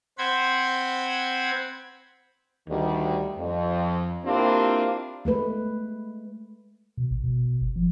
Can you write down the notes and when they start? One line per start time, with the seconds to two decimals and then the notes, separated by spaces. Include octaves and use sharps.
0.18 C4 C5 F#5 B5 G#6
2.68 D2 D#3 G3
3.39 F2
4.26 A#3 C4 D4 E4 F4 G4
5.25 G#3 A3 B4
6.97 B2
7.11 A1
7.24 B2
7.61 G1
7.76 F3